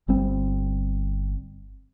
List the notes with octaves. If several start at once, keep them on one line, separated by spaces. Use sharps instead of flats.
G1 G3 C4